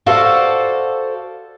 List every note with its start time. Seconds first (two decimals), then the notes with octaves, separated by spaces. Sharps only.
0.06 F#4 A4 C5 D5 F5 F#5